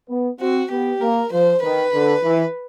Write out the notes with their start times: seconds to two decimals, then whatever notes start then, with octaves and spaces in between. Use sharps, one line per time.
0.09 B3
0.40 C4 F#4
0.70 B3 G4
1.01 A#3 A#4
1.32 F3 C5
1.62 D#3 B4
1.93 D3
2.23 E3